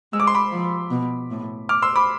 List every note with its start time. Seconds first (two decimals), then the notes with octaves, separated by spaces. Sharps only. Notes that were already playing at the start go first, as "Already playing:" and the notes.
0.13 G#3 E6
0.20 D6
0.27 C6
0.35 B5 D6
0.51 F3
0.90 B2
1.31 A2
1.69 D6 F6
1.82 C6 E6
1.96 B5 D6